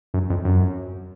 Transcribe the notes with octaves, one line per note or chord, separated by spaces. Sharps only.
F#2
F2
F#2